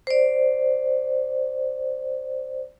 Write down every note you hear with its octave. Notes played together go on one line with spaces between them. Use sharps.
C5 D5